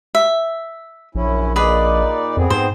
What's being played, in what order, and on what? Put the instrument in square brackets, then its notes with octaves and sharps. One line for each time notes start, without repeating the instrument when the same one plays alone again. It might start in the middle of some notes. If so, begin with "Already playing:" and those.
[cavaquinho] E5
[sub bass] A#1 [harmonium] F#2 C#4 E4
[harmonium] A#2 D#4 D5 [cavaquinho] G#4 B4
[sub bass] F2 [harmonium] B3 C4 G#4
[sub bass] G#2 [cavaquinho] C5